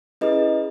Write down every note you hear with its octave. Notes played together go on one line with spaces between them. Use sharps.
C#4 E4 G#4 B4 D#5